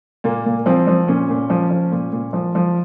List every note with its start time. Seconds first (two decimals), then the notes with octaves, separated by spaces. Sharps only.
0.24 A#2 A#3
0.46 A#2
0.66 F3 C4
0.87 F3
1.08 A#2 C#4
1.30 A#2
1.50 F3
1.70 F3
1.92 A#2
2.13 A#2
2.33 F3
2.55 F3